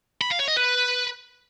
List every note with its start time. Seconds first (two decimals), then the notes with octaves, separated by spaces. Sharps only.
0.21 B5
0.30 F5
0.39 C#5
0.48 D#5
0.56 B4